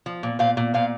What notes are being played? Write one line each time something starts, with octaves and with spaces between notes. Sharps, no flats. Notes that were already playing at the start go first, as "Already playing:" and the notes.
F3
A#2
A#2 C5 F5
A#2
A#2 C5 F5